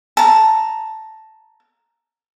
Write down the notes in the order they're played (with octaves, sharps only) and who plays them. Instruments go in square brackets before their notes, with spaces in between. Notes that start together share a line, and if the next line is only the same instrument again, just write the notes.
[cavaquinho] A5 A#5